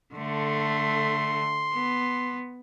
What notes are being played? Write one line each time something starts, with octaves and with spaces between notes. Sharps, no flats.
D3 A3 C6
B3